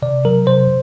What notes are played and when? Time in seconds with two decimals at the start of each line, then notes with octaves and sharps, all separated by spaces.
0.02 C3 D5
0.25 F#3 A#4
0.47 C3 C5